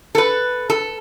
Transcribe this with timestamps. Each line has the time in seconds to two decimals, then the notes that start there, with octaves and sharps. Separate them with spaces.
0.15 A4 B4
0.70 A4